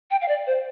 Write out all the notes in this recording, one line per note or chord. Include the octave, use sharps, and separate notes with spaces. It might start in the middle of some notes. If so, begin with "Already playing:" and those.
G5
F5
D5
C5